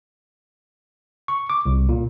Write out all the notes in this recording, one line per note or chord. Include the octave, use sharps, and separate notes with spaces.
C#6
D6
C2
A#2